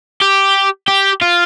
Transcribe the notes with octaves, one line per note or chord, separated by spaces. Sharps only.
G4
G4
F4